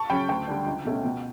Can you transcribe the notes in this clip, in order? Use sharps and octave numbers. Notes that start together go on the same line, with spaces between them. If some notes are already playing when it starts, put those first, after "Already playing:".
Already playing: A5 C#6
C#3 F#3 C#4 G5 B5
D2 G5
D3 G3 D4
C#2
B2 A3 C#4
B2